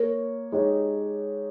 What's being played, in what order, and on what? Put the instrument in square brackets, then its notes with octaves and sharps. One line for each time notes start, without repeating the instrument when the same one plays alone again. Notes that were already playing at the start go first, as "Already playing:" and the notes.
Already playing: [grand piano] A#3 C#5 [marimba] A#4
[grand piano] G#3 D#4 G4 C#5